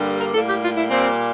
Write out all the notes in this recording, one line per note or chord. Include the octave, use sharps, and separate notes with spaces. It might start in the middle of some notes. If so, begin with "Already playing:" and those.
Already playing: G2 D3 G3 A#3
A#4
A2 G3 A#3 A4
G4
F4
E4
A#2 G3 A#3 C4